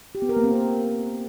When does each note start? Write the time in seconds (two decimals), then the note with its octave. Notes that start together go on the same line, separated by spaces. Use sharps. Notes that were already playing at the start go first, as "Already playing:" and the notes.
0.15 G4
0.22 B3
0.29 A#4
0.37 A#3
0.44 C4